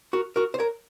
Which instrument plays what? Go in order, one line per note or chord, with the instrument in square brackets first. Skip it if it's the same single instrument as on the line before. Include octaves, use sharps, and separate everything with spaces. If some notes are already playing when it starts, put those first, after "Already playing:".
[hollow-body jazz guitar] F#4 A#4
F#4 A#4
C5
A#4 C#5